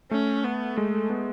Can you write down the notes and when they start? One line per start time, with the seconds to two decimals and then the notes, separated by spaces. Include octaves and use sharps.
0.11 A3 C#4
0.44 B3
0.77 G#3 A3
1.10 B3